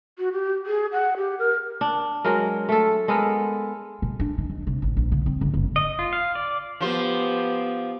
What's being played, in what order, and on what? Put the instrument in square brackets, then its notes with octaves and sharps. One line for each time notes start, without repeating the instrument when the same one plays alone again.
[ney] F#4
G4
G#4
F#5
G4
A#4
[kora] D4
F#3 G#3 A#4
A3 A4
G#3 B3 A4 A#4
[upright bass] B2
D4
D#3
E2
C3
A1
A#1
C#3
C4
C#2
F#1
[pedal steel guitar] D#5
F4
F5
D5
[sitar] F3 C5 [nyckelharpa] B3 G4